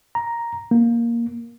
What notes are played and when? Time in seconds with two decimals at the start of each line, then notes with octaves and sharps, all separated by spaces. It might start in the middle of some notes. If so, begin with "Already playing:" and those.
0.15 A#5
0.71 A#3